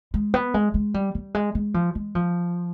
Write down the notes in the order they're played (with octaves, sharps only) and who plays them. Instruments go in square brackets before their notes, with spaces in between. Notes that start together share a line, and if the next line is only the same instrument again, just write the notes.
[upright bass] G#3
B3
G#3
G#3
G3
G3
G#3
G#3
F3
G#3
F3